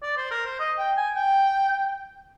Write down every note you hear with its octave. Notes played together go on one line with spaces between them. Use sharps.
D5
C5
A#4
C5
D#5
G5
G#5
G5